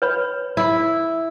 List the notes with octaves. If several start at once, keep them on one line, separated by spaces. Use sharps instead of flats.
B4 C#5 B5
E4